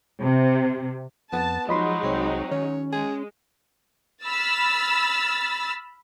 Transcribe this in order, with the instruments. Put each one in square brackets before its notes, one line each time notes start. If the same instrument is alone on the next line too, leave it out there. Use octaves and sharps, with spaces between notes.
[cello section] C3
[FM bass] F2 [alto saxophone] B3 [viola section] A5
[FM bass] F3 [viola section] F#3 G#3 D#4 [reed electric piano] D#5 B5 C6
[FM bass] C2 [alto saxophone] C4
[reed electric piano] D#3 [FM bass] C#4 [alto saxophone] C#5
[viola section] G#3 [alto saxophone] G#4
[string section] B5 E6 F6 A6